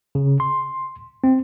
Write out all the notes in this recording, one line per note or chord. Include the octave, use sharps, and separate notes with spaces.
C#3
C6
C4